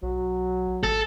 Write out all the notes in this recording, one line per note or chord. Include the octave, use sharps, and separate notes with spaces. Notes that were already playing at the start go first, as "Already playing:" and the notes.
B1 F#3
G#1 A4